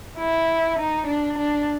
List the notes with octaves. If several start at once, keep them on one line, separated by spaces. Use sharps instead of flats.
E4
D#4
D4
D4